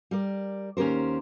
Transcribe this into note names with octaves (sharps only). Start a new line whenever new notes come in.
G3 A#4 D5
D#2 C#4 G4 A#4 C5